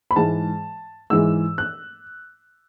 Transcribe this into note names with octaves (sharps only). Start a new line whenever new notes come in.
B5
G#2 E3 G#3 A5
G#2 E3 G#3 E6
F#6